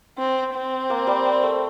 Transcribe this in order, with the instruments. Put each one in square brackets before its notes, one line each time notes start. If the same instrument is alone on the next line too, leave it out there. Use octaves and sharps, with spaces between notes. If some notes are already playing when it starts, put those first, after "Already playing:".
[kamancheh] C4
C4
[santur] A#3
G3
A3